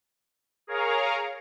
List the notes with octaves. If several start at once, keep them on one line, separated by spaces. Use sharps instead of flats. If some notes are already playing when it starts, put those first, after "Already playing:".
G#4 A#4 C#5 F5 A#5